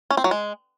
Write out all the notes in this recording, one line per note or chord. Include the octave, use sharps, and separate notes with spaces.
C#4
C4
F#3
G#3